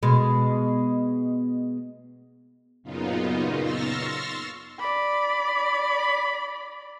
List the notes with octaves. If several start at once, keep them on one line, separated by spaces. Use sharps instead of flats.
B2 G#3
F#2 A#2 C#3 B3 D#4 F4
C6 C#6 E6 F6 A6 A#6
D5 B5